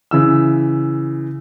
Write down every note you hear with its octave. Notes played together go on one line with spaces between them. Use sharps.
C#3 E3 E6